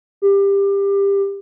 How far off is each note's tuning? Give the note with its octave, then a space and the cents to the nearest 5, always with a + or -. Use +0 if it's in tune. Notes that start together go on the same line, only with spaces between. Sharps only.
G4 +20